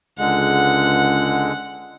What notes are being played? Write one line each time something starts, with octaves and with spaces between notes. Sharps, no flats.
C#2 D3 G#3 F#5